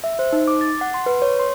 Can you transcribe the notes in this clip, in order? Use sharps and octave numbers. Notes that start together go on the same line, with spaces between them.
E5
C5
D#4
D6
A6
F#5
C6
B4
C#5
C6